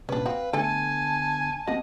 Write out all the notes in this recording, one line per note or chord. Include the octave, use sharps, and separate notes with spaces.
C2 A#2 C#4 D4 B4
C4 F#4 F5
D3 A3 B3 A4 G#5 A5
A#3 C4 F#4 D#5 F#5